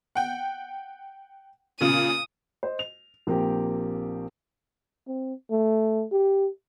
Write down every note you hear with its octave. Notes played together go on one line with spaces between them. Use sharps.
F#5 G5
A#2 C#3 D#6 D#7
C5 D#5
F7
A#1 A#3 C4 G4
C4
A3
G4